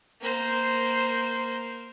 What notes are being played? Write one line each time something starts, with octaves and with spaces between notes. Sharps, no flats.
A#3 C5